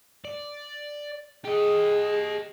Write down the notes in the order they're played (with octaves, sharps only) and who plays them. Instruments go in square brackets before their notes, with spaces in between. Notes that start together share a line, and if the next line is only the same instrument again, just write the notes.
[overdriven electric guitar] D5
[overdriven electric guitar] G4 D#5 [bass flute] G#4